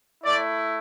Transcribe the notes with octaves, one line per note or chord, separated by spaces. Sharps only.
A3 E4 D5